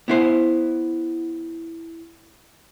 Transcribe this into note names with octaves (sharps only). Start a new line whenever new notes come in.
B3 E4 C5